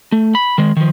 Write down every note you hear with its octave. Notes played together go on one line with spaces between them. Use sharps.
A3
B5
D#3 G#3
D#3 F3